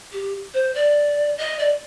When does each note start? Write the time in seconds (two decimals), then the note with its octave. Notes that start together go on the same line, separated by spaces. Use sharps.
0.11 G4
0.54 C5
0.75 D5
1.38 D#5
1.59 D5